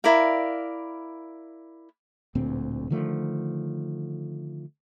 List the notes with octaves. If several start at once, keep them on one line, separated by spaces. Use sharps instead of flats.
E4 A#4 D5 F5
D1 D2 A#2 C4
D3 D#3 F3 A3